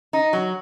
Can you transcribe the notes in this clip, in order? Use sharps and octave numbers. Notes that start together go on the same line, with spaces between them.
D#4
F#3